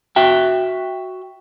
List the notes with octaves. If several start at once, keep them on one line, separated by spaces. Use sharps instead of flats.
F#4 E5 G5